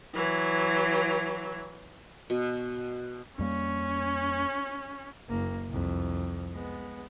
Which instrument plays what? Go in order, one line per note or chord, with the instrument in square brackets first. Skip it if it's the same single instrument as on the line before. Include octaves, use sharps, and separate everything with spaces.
[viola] E3 F#3
[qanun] B2
[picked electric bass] F2 G3 A#3 [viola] C#4
[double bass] F#1 A#3
C2 F2
G#3 B3